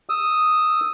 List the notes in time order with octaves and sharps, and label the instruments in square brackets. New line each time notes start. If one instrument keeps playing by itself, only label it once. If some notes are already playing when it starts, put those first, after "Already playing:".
[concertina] D#6 E6